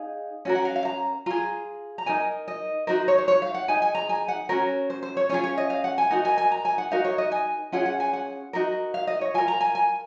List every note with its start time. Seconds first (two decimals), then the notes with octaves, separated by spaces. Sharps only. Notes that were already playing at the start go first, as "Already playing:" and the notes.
Already playing: D#4 G#4 F5
0.45 C#4 F#4 A#4
0.55 F#5
0.65 F5
0.76 F5
0.85 A#5
1.26 F4 G#4 A#5
1.98 A#5
2.06 D#4 A#4 G#5
2.48 D#5
2.87 D#4 F#4 A#4 C5
3.08 C#5
3.18 C5
3.28 C#5
3.42 F5
3.54 F#5
3.68 D#4 G#4 G#5
3.82 G#5
3.95 A#5
4.09 G#5
4.28 F#5
4.49 C#4 F#4 A#4 C#5
4.90 C5
5.03 C5
5.17 C#5
5.29 C#4 F4 G#4 C#5
5.44 C#5
5.58 D#5
5.70 F5
5.84 F#5
5.98 G#5
6.10 D#4 F#4 A#4 F#5
6.25 G#5
6.38 G#5
6.52 A#5
6.65 G#5
6.78 F#5
6.91 D#4 F#4 A#4 F5
7.05 C#5
7.18 D#5
7.32 G#5
7.72 C#4 F4 G#4 F#5
7.86 F#5
8.00 G#5
8.13 F#5
8.53 D#4 F#4 A#4
8.94 F5
9.07 D#5
9.21 C#5
9.34 F4 A#4 G#5
9.48 A#5
9.61 G#5
9.75 G#5